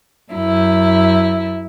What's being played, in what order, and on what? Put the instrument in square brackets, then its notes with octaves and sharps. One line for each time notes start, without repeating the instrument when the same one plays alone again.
[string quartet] F#2 E4